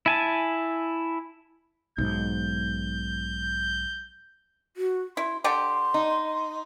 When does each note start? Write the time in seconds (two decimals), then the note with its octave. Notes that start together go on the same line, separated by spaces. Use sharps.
0.06 E4 G#5 A5
1.98 B1 G#2 G6
4.77 F#4
5.17 E4 C6
5.44 D3 G4 C6
5.94 D#4